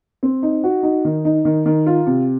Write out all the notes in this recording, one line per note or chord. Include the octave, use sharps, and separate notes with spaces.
C4
D#4
F#4
D#4
D#3
D#4
D#3
D#3
F4
C3